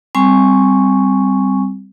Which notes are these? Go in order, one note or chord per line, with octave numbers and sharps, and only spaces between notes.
G3 C4 G#5 C#6